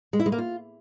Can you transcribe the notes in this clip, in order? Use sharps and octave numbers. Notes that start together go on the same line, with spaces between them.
G#3
E4
G#3
A#3
F4